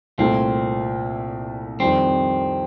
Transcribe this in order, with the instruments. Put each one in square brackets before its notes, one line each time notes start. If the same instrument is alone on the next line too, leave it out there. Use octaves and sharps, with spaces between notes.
[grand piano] C2 A#2 A3 [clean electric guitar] C4
[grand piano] F2 D#3 G3 [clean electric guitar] C4